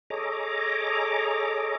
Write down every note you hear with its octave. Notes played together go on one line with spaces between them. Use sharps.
G#4 A4 C#5 D#5 A#5 D6